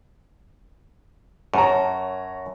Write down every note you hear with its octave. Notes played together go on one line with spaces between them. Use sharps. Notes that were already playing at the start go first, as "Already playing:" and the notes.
F#2 C#5 A5 A#5